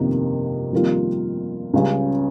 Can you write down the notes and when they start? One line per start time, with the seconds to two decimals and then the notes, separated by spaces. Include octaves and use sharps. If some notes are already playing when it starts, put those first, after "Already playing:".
Already playing: G1 F2 C3 D#3 A#3
0.73 F2 D#3 G3 A#3 F4
1.73 C#2 C#3 G3